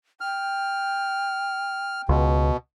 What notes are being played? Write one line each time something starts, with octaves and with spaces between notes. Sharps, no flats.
G5 F6
C#2 B2